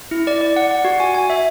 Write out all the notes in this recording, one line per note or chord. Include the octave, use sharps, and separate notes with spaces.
E4
D5
D5
F#5
F#5
F#4
G#5
G#5
E5